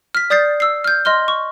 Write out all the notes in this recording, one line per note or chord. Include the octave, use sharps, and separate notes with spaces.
F6 B6
D5 D#6 G6 A6 C7
E6 C7
F6 G6
D#5 C6 F6 G7
C#6